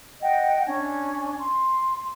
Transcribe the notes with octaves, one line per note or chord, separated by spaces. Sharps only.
D#5 F#5 G5
C#4 D4 G#5
C6